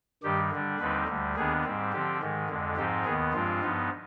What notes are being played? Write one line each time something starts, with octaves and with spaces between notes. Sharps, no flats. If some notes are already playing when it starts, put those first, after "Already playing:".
G2 D#3 G3 G4
D3 G3 D4
D#2 D3 G3 C4 D#4 B4
D2 D3 G3
D#2 D#3 B3 D4 G#4
G#2 G3 C4
D3 F3 C4 G4
G#2 D#3 G#3
F2 D3 G#3
G#2 F3 C4 D#4 G4
D#2 D#3 B3 G#4
G2 F3 G#3 C4 F4
G2 F3 B3 D#4